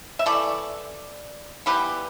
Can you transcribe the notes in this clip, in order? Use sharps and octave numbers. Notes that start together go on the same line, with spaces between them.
E5
E3 A3 A4 D5
E3 G3 B3 G4 B4